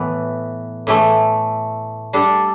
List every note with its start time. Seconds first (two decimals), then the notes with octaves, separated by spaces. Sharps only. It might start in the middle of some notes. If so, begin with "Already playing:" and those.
Already playing: A2 E3 B3
0.87 A2 E3 A3
2.13 G3 D4 A4